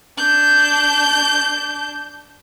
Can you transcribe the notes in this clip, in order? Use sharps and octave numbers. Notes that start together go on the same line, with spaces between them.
D4 G6